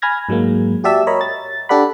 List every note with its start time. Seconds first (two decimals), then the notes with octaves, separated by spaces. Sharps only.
0.02 G#5 B5 F6 G#6 A#6
0.29 G#2 F#3 G#3 A#3
0.84 F#4 G4 D5 E5 A5 E6
1.07 A#4 C#5 D#5 A#5 B5
1.21 A6
1.69 D4 G4 A4 D5 F#5 B5